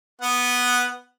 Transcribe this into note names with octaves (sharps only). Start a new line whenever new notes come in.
B3 F#5